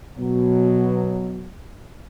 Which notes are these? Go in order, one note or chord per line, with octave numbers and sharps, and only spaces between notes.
B2 F#3